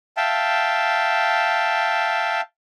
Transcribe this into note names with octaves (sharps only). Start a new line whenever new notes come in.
E5 F5 G5 A5